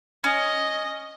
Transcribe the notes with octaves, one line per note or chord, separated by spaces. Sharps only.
C#4 D#5